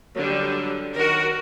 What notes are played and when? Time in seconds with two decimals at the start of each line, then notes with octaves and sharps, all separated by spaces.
0.16 D3 F#3 G3
0.96 D#3 F#4 A#4